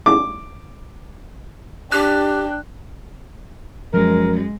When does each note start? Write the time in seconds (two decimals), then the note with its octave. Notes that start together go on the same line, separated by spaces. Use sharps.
0.06 D6
1.92 D4 G4 G5 F#6
3.94 F#2 F3 G#3 A#4